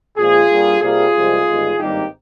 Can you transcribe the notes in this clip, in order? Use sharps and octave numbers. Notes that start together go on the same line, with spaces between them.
A#1 A#2 F3 G#3 F4 G#4
G2 G3 A#3
C2 C3 G3 A#3 F4 G#4
C2 C3 F3 G#3
G1 G2 D#3 G#3
G#1 G2 D#3 G3 A#3 D#4 G4